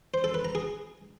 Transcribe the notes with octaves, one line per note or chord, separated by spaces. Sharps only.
C5
A4
B4
A#5
G#4